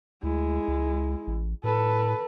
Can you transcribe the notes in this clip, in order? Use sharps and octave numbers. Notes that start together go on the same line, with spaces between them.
D2 G#3 E4
C#2
A1
A2 A4 B4